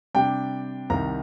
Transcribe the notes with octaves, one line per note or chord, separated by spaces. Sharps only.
C3 G3 D4 G5
C2 C3 D#3 A#5